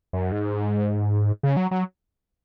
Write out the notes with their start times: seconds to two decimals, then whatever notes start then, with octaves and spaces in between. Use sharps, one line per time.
0.13 F#2
0.32 G#2
1.43 C#3
1.57 F#3
1.71 F#3